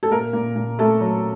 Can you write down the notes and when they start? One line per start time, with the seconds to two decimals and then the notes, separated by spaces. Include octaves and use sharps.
0.03 A4
0.11 A#2 A#4
0.33 A#2
0.55 A#2
0.79 A3 A4
1.01 F#3